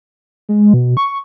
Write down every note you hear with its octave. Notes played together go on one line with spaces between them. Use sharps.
G#3
B2
C#6